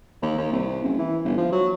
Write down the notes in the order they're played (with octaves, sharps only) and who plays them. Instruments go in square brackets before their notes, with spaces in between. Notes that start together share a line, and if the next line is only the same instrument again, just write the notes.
[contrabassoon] D#2
D#2
C2
F#1
E3
G1
F3
F#3